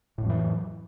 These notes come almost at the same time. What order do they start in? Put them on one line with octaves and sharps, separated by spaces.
A2 F2 F#3 E3